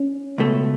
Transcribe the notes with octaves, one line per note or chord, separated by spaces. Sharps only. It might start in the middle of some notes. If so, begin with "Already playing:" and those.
Already playing: C#4
C#2 B2 A3